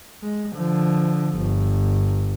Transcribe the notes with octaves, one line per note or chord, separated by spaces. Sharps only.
G#3
D3 F3
G1